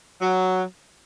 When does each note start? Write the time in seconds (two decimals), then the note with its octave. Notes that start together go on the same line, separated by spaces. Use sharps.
0.22 F#3